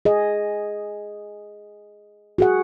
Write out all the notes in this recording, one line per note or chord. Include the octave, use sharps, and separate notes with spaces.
G#4 D#5
F#4 G#4 F#5